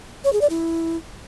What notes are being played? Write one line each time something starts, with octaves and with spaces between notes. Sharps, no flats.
C#5
G#4
D5
E4